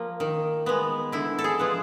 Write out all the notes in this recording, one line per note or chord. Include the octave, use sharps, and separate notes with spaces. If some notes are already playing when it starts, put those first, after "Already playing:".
Already playing: F3 A#3
D#3
G#3 B3
D3 E4
A4
G#4
F3 G#3 B3